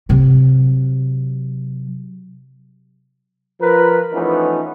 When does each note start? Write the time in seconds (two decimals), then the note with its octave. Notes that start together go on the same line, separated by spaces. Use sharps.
0.09 C3 F#3
3.61 F3 A#4 B4
4.13 E3 F3 A3 B3 C#4 D#4